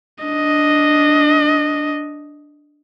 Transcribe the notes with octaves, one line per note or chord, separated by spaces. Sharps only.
D4 D#5